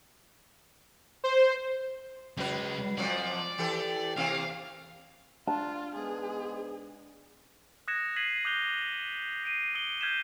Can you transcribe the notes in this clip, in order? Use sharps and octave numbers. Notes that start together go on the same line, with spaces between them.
C5
C#3 F#3 G#3 B4
F2 F3 F#3 D5
E3 G4 A4
C3 E3 A#3 F5
D4 F4 A5
G#2 G#3 B3 G#4
D#6 F#6 G#6 A#6 C#7 E7
F6 G#6 B6 C7 D#7 F#7
D6 D#6 F#6 G6 F7 G7
C7 D7 D#7
D#6 C#7 D7 F#7 G7
F6 G6 G#6 B6 C7 E7